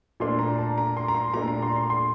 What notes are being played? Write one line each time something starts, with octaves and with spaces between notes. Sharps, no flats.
A#2 A3 D4 C6
A#5
A5
A#5
C6
A#5
C6
A#2 A3 D4 A#5
A#5
C6
C6
C6